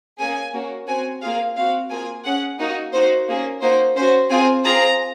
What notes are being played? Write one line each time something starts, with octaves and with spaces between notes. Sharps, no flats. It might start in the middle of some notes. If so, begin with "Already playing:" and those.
A#3 C#4 G#4 G#5
A#3 C#4 F#4
C4 F#4 G#5
A#3 F4 G#4 F5
C4 F#4 F5
A#3 F4 G#4 G#5
C#4 G#4 F#5
A#3 D#4 F#4 D#5
A#3 D#4 F#4 C5
A#3 C#4 G#4
A#3 D#4 F#4 C5
C#4 F#4 C5
C4 F4 G#4 G#5
C4 F4 G#4 A#5